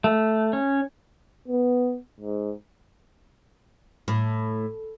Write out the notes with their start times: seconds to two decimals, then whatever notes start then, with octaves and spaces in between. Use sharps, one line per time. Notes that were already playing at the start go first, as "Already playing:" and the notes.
0.04 A3
0.53 C#4
1.48 B3
2.20 G#2
4.08 A2